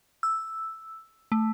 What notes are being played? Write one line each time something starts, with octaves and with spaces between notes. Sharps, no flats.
E6
A3